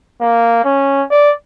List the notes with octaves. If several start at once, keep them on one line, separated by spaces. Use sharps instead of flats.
A#3
C#4
D5